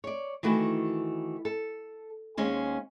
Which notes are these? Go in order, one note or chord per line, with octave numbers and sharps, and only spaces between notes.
C#5 D5
D#3 E3 A3 F#4
A4
D#2 G#3 C#4 C5